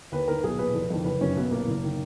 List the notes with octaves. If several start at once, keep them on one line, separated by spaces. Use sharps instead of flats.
D#2 B4
D#3 A#4
B1 G#4
A#2 B4
F1
F2 D#3
F#1 B4
F#2 D#3 C#4
B1 B3
A#2 A#3
F#1
D#3